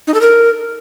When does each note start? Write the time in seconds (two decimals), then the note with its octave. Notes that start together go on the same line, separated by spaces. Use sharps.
0.07 D#4
0.14 A4
0.21 A#4